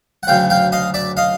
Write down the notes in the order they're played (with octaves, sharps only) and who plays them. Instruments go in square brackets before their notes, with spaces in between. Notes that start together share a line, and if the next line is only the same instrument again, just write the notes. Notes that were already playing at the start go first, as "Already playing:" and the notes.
[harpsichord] F#5
D2 C#3 F#3 F5 G5
F5 G5
D#5 F5
D5 E5
D#5 F5